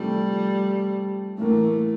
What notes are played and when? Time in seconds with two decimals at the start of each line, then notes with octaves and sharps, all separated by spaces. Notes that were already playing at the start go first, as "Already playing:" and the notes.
Already playing: C3 F3 G3 A3
1.38 A2 E3 A3 A#3